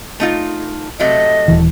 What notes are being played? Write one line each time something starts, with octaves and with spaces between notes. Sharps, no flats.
A3 D#4 F4
C3 F#3 A3 D#5
D#1 E3